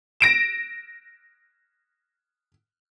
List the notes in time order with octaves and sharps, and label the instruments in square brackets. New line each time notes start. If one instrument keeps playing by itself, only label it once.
[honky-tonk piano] A#6 D7 E7